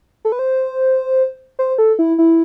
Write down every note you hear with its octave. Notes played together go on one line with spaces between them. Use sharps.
A4
B4
C5
C5
A4
E4
E4